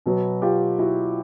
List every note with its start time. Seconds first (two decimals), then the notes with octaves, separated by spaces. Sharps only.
0.06 B2 F#3 B3
0.42 F4 G4
0.79 E4 F#4